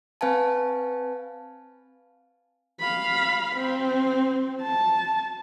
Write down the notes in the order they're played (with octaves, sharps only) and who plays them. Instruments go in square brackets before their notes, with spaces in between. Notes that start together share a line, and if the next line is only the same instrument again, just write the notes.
[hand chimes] C4 B4 F5 G#5 A5
[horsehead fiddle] F5 B5
C4
A5